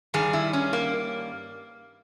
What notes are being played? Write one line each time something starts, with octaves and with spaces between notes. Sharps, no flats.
G2 D#3 G3 G#4
E4
C#4
A#3